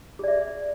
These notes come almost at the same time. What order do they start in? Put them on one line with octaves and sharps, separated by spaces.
G#4 D5 E5